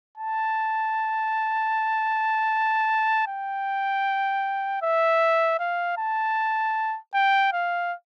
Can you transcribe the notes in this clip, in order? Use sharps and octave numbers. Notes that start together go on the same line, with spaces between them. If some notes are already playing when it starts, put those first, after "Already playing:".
A5
G5
E5
F5
A5
G5
F5